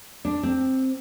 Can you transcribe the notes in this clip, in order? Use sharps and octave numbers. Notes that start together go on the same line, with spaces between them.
D4
C4